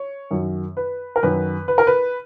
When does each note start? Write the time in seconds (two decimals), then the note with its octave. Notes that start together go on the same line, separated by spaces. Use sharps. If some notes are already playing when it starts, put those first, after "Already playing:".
Already playing: C#5
0.31 F#2 D#3 F#3
0.77 B4
1.16 A#4
1.23 F#2 D#3 F#3 B4
1.68 B4
1.78 A#4
1.87 B4